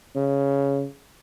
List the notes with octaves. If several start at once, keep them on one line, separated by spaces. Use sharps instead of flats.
C#3